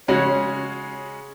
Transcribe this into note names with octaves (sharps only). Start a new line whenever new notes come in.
C#3 G#3 C#4 F#4 C#5